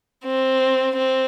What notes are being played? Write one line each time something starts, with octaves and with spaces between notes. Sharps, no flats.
C4
C4